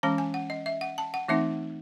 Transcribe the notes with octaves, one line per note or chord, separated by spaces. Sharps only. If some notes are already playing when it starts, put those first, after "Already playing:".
E3 G#3 C#4 A5
G#5
F#5
D#5
E5
F#5
A5
F#5
E3 A3 C4 D#4 E5